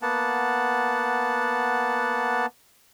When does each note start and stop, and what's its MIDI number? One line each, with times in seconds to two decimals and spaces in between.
0.02 2.46 58
0.02 2.46 59
0.02 2.46 78
0.02 2.46 81